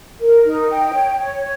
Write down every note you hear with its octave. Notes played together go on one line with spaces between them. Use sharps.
A#4
D#4
G5
C#5
C#5